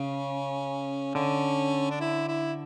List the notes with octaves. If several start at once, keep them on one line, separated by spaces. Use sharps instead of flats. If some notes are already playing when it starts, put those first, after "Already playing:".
Already playing: C#3 C#4
D3 C#4
D4
E4
E4